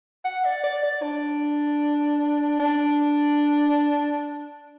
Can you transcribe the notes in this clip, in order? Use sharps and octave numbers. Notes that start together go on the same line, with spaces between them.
F#5
D5
D5
D5
D4
D4